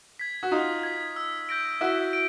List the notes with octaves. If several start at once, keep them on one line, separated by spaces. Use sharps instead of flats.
G#6 B6
F#4
D#4 F4 D#6
G#6 B6
E6
G6 A#6 D7
E4 F#4 E6
D7